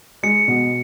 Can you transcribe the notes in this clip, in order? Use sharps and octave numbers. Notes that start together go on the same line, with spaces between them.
G#3 C#7
B2